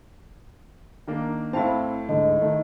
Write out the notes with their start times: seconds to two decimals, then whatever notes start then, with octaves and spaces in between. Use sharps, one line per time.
1.07 D#3 A#3 D4
1.53 A2 C4 E4 F5 A5
2.09 D2 G#2 D3 D#5
2.41 D#3 A3